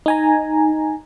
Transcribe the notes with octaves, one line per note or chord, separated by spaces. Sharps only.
D#4 G#5 A#5